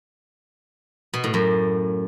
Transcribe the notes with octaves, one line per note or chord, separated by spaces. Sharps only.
B2
A2
F#2